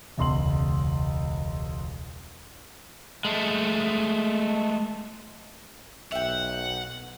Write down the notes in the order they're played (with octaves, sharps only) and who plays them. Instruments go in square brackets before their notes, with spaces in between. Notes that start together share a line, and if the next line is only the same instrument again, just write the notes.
[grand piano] E1 C#2 C6 F#7
[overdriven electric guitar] G#3 A3
[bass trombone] B1 [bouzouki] E5 G5 [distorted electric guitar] F#5